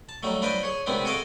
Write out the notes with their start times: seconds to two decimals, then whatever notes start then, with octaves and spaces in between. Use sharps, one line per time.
0.09 A5
0.23 F#3 G3 A3 D#4
0.42 D4 F4 B4 C5 D5 D#5
0.63 G#4 C#5
0.86 C3 D#3 G#3 B3 C4 D4
1.05 F#4 G#4 A4 D#5 F5 D6